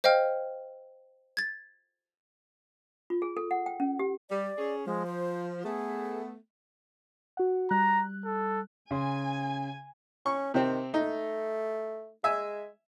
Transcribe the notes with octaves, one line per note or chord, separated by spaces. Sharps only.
C5 D#5 F5 G5 F6
G#6 A6
F4
G#4
A4
F#5
G5
C#4
G4
G3 D5
C#4 G#4
F3 G#3
C5
A3 B3 G#4
F#4 F#5
G3 A#5 F#6
A4
C#3 G#5 C6
C#4 C#6
C3 D#3 C4
A3 D#4
G#3 E5 G#5